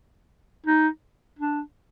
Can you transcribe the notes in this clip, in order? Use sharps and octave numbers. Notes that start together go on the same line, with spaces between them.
D#4
D4